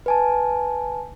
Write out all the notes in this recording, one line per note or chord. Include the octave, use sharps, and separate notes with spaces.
B4 G#5 A5